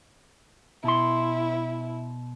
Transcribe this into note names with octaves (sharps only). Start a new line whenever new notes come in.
B2 E4 C6